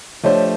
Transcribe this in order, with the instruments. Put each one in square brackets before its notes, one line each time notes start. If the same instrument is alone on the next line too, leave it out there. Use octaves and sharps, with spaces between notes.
[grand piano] F3 A3 D4 G4 C5 [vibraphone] C#5 D#5